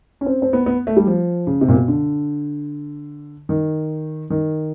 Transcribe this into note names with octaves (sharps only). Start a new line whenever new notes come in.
C#4
C4
C4
B3
B3
A3
G3
F3
C#3
C3
A#2
B2
D3
D#3
D#3